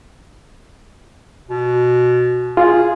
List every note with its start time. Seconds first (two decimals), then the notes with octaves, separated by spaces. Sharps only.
1.50 B2
2.57 F4 G#4